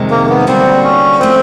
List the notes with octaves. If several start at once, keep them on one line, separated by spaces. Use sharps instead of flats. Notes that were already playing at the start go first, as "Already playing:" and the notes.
Already playing: F2 C3 D#3 G#3
A#3
B3
D3 G3 A#3 C4 D4 F#4
C#4
F3 A3 C4